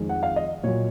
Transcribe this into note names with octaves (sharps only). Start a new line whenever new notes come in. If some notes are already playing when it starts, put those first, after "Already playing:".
Already playing: F2 D#3 G#3
F#5
F5
D#5
A#2 F#3 C#5